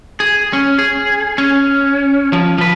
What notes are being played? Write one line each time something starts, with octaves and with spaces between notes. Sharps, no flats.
G#4
C#4
G#4
C#4
F3
F3 B4